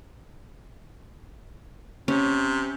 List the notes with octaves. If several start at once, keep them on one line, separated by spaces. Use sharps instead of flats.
C3 C#4